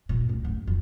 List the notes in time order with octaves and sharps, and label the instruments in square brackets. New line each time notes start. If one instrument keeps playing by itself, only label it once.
[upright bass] A#2
C#2 A2
F#1
F2